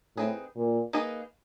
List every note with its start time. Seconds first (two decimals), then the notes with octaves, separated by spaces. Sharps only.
0.17 A2 C4 D#4 G#4 B4
0.56 A#2
0.93 A#3 D#4 G#4 B4 D#5